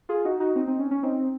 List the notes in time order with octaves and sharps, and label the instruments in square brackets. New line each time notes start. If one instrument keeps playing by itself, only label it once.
[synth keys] F4 G#4
D#4 F#4
D#4 F#4
C4 D#4
C4 D#4
C#4
C#4
C4 D#4